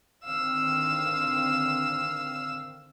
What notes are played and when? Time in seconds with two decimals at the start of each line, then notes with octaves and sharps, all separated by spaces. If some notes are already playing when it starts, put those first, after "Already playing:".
0.24 D3 D#3 C4 F5 E6